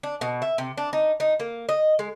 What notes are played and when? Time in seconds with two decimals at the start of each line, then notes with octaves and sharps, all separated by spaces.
0.03 D4
0.21 B2
0.42 E5
0.58 C3
0.78 D4
0.93 D#4
1.20 D#4
1.40 A#3
1.69 D#5
1.99 G#3